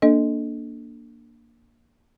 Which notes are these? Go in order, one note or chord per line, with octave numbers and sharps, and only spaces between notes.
A#3 D4 A4 D#5